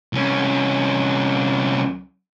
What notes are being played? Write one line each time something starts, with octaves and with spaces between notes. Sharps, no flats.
C2 C#4